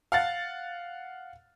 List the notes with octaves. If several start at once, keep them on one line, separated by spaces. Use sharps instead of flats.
F5 F#5 A6